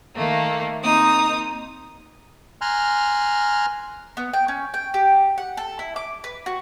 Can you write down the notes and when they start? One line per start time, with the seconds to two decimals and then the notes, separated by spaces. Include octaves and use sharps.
0.16 D#3 A3 A#3
0.82 A#3 C4 D#4 D#6
2.61 G#5 A#5 C6 F6 F#6
4.17 B3
4.33 G5
4.48 C#4
4.74 G5
4.94 G4
5.38 F#5
5.57 A4
5.79 E4
5.96 D6
6.24 B4
6.46 F#4